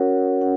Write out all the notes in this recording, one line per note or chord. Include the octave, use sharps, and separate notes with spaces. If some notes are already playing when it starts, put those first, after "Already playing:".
Already playing: C#4 F#4 A#4 C#5 F#5
C#4 F#5